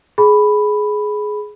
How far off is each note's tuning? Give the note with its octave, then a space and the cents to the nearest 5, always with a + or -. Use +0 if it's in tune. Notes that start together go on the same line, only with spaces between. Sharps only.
G#4 +15 B5 +0